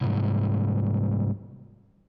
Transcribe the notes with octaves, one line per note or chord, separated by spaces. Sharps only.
C2 G#2